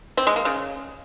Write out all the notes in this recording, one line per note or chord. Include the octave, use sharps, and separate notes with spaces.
C4
G#3
A#3
C#3